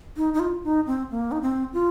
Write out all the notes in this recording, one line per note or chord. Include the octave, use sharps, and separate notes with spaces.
D#4
D#4
F4
D#4
C4
A#3
D#4
C4
F4